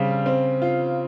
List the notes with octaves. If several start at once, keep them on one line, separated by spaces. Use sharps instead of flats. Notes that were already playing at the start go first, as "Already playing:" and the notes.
Already playing: C#3 G3 C4
C4
F4